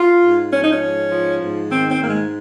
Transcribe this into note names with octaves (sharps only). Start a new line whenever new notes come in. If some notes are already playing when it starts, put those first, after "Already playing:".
Already playing: F4
G#2
F3 C#4
D#4
C#4
G#2
F3
G#2
D#3 C4
C4
G#2 A#3
G#3